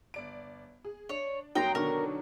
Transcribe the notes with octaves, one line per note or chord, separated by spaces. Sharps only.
G1 D5 D7
G#4
D4 C#5
F1 F#3 A#3 D#4 G5 A#5 C6
B2 D3 D#3 A#4 C#6